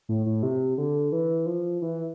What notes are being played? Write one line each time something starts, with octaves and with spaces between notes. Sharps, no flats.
A2
A2
C3
D3
E3
F3
E3